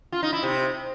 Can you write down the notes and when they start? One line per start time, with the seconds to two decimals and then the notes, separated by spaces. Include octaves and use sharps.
0.12 F4
0.23 D#4
0.33 E4
0.43 C3